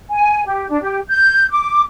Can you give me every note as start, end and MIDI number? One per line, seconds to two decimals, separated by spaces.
0.10 0.41 80
0.46 0.68 67
0.69 0.81 62
0.81 0.99 67
1.07 1.45 91
1.50 1.81 86